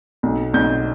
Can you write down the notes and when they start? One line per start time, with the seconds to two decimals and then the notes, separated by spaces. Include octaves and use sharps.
0.23 B1
0.54 B1 G6